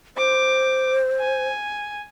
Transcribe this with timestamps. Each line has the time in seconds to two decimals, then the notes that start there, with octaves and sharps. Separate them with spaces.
0.17 C5 D6
1.20 G#5